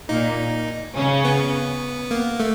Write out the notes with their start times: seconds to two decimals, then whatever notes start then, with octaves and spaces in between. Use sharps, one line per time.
0.09 A#2 A#3 D#4
0.96 C#3 C#4
1.25 B3
2.11 A#3
2.40 A3